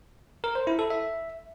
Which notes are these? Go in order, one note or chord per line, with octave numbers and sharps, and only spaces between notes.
A#4
C5
E4
A4
E5